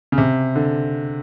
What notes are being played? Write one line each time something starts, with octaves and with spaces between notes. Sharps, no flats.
C#3
C3
D3